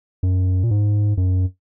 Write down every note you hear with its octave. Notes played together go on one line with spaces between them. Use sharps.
F#2
A#2
G#2
F#2